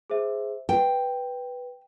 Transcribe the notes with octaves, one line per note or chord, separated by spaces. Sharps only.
G#4 C5 E5
B4 G5